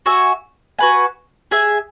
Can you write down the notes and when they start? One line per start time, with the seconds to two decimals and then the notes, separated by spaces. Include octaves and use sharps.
0.06 F#4 E5 G#5
0.79 F#4 B4 G#5
1.51 G#4 E5 G#5